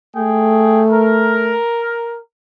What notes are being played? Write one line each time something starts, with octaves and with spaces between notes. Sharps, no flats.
A3 G#4 G5
A#4